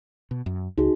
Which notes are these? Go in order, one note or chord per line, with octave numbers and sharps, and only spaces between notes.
B2
F#2
C#2 D#4 F#4 G#4